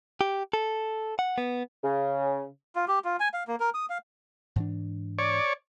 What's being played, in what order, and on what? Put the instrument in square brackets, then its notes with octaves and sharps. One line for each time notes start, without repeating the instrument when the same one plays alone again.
[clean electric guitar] G4
A4
F#5
B3
[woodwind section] C#3
[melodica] F4
G4
F4
G#5
F5
A#3
A#4
D#6
F5
[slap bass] G#2 E3 D4
[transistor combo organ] C#5 D5